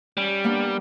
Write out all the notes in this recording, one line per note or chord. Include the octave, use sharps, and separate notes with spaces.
G3 C#4
A#3 B3 D4